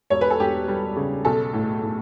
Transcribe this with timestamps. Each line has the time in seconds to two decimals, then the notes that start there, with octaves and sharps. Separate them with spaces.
0.10 E1 C#5
0.21 B4
0.30 A4
0.40 E1 G4
0.68 G3
0.96 C#3
1.25 B1 A4
1.53 A2
1.82 A2